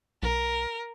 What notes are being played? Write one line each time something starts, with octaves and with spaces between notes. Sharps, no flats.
B1 A#4